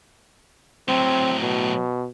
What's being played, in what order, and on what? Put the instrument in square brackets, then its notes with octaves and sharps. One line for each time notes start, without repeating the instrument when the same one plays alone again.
[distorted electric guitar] A2 F#3 [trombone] C4
[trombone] B2